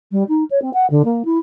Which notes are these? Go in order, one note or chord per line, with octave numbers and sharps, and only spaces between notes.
G3
D#4
C#5
C4
F#5
D3
A#3
E4